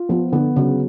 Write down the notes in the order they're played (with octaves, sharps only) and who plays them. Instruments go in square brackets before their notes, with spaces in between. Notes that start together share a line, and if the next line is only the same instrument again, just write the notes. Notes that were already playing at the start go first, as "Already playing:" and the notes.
Already playing: [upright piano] F4
[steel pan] F3 [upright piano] B3
[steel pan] D3 [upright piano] B3
[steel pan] C#3 [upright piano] F#3